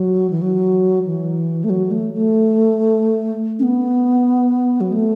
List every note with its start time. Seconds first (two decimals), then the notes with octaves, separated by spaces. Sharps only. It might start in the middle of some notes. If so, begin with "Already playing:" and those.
Already playing: F#3
0.30 E3
0.42 F#3
1.05 E3
1.64 A3
1.70 F#3
1.91 A3
2.13 A3
3.59 C#4
3.63 B3
4.81 F#3
4.92 A3